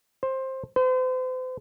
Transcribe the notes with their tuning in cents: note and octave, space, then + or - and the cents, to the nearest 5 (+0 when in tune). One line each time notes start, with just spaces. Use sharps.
C5 +15
C5 -40